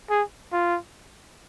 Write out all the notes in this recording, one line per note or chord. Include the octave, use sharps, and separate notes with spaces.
G#4
F4